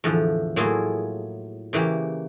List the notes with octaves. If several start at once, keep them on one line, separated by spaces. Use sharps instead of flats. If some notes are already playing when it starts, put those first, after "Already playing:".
E2 A2 D3 F3
A2 F#3 A#3 E4 F4 G#4
C#3 E3 A#3 G4